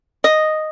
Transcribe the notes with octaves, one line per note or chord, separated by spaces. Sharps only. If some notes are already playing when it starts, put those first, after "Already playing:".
D#5